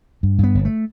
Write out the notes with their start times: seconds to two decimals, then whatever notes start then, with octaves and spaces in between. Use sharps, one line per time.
0.23 G2
0.39 G2 B3
0.55 G1
0.65 A3